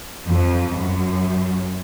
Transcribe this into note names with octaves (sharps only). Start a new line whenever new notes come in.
F2
F#2